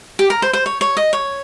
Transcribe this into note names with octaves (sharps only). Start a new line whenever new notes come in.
G4
A#4
C5
C5
C#5
C#5
D#5
C#5